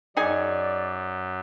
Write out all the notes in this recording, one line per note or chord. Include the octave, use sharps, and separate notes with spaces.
F#2 D#4 G#4 D5 G#5